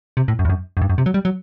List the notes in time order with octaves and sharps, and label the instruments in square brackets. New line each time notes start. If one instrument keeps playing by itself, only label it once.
[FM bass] C3
A2
F#2
E2
F#2
F#2
G2
F#2
C3
F#3
G3
F#3